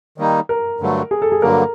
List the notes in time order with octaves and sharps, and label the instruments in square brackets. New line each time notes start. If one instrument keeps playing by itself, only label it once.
[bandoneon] D#3 G3 A#3 D#4
[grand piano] A#4
[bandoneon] G2 D3 F#3 A3
[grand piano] G#4
A4
G#4
[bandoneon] G2 D3 F#3 A#3 [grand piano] A#4